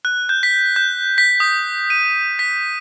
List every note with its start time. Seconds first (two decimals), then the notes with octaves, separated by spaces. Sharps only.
0.05 F#6
0.29 G6
0.43 B6
0.76 G6
1.18 B6
1.40 D#6
1.90 D#7
2.39 B6